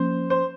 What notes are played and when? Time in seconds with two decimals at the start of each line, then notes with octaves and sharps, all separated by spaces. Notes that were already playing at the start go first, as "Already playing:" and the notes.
Already playing: F3 A#3 C#4 C5
0.30 C5